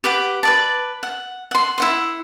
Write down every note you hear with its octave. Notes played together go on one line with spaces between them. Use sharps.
G4 B4 F#5 D6
B4 D5 A5
F#5
F#5 C6
E4 F#5 C6